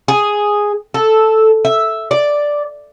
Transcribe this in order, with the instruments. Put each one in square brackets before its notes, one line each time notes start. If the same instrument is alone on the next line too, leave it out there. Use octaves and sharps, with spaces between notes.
[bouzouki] G#4
A4
E5
D5